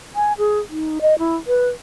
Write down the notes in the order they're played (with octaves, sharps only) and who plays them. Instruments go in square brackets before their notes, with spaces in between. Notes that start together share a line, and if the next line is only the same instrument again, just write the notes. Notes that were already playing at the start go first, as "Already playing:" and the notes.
[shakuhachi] G#5
G#4
D#4
D#5
E4
B4